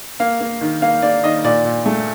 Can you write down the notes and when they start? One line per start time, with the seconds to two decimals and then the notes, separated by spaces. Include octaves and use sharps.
0.20 A#3 F5
0.41 A#3
0.61 D#3
0.82 A#3 F5
1.02 A#3 D5
1.23 D#3 D#5
1.44 A#2 D5
1.65 A#2
1.86 A3